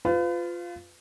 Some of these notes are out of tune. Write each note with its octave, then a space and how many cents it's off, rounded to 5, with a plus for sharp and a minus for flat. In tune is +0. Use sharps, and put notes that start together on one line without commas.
F4 +0 B4 +40